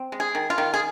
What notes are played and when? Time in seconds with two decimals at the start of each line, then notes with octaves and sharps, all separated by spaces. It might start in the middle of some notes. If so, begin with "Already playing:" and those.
Already playing: C4
0.12 G#3
0.20 G#4
0.35 D#3
0.50 F4
0.58 D#3
0.74 G#4